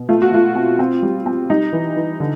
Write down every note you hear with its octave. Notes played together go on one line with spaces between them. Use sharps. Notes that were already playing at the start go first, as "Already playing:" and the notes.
Already playing: B2
A3 F4
F#4
A3 F4
C4
C4
G3
C4
G3 D#4
E3
E3
D3